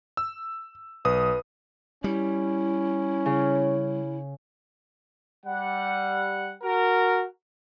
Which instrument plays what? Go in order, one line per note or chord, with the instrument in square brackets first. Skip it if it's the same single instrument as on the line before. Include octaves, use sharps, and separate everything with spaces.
[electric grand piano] E6
[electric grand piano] B1 D#6 [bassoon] B4
[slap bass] G3 [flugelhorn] C#4 [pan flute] E4
[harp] C#3
[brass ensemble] G3 F#5
F#4 A#4